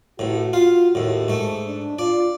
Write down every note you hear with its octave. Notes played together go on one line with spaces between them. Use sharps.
A1 A2 F#4
F4 F5
D#2 A2
G#2 A3
D4
F4 D5